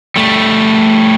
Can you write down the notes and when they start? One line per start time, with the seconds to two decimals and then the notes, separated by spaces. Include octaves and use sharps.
0.16 G3 A3